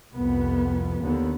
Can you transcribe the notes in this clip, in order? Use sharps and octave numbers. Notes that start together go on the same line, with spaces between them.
C2 F2 B3
D#2 D3 B3